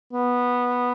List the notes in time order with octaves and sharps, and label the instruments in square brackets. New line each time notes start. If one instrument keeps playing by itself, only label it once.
[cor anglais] B3